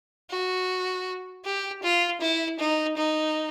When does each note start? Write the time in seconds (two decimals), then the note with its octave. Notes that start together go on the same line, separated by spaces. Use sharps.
0.30 F#4
1.45 G4
1.83 F4
2.21 E4
2.60 D#4
2.97 D#4